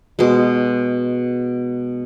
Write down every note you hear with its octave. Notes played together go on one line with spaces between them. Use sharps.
B2 G#3